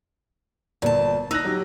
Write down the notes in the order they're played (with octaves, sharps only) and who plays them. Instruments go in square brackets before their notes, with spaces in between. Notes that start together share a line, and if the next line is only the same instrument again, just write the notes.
[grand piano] G1 [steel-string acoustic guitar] A#2 A5
[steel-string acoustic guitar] D#4 [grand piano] E6 F#6 A#6
[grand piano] F#3 G4